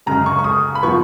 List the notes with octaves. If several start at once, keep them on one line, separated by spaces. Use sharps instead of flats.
F#2 C#3 G#3 A#5
C#6
C#6
D#6
B5
F3 B3 C#6